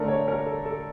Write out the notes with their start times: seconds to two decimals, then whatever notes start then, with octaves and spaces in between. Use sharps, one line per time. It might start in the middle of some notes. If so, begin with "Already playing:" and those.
Already playing: D3 A3 D4 A#4
0.08 C#5
0.28 A#4
0.46 A4
0.66 A4